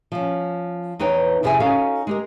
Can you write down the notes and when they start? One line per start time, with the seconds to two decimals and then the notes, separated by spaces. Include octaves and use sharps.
0.12 F3 C#4
0.99 E2 D#4 B4 C#5 G5
1.43 F2 C3 E4 G#4 E5 G#5
1.60 C#4 D#4 F#4 A4 F5
2.07 G#3 G4 A#4